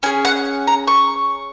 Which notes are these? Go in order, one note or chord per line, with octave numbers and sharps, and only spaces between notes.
C#4 G#4 G#5
F#5
A#5
C#6